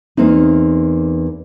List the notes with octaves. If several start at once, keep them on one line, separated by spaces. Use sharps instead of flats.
E2 A#3 C4 D#4